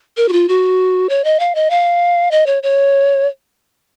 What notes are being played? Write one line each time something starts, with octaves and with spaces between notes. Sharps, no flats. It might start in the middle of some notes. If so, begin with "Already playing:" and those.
A#4
F#4
F4
F#4
C#5
D#5
F5
D#5
F5
D#5
C#5
C#5